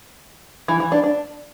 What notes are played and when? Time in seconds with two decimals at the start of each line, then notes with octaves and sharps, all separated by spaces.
0.68 E3
0.80 E3
0.92 D4
1.04 D4